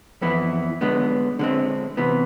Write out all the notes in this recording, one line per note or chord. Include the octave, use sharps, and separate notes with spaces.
F2 E3 B3 E4
D3 G#3 B3
D3 G#3 C4
C3 E3 B3